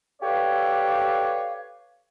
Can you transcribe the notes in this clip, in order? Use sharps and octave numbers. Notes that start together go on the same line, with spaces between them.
G4 A4 B4 C#5 D5 F5